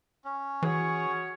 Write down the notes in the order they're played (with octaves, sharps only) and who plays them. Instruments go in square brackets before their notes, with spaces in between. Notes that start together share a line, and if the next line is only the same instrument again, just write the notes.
[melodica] C#4
[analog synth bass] E3 [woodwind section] F#4 G#4 C#5